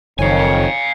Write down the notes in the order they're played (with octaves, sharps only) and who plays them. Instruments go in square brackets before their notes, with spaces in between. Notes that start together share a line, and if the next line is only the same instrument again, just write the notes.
[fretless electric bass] F#1 [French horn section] F2 D#3 [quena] C#5 [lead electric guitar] F5 G#5